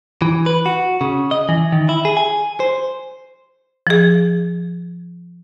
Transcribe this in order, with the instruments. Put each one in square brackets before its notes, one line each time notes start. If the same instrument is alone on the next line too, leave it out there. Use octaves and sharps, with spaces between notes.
[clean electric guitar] E3
B4
F#4
C#3
D#5
E3
D#3
E4
G#4
G#5
C5
[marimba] F3 G#4